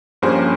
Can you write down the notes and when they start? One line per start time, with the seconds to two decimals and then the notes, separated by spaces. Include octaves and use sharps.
0.22 G2 F3 A#3 C#4 G4 G#4 C5